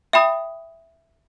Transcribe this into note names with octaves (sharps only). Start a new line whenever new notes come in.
E5 G5 B5 D#6